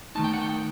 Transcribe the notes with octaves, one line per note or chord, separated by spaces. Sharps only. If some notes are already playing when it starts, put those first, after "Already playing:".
D#3 A3 D#4 A5
G5
F#5
G5